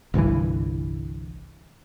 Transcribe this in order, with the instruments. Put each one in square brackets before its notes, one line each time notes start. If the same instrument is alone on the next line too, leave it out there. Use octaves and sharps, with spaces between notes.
[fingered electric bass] G1 C2 G2 E3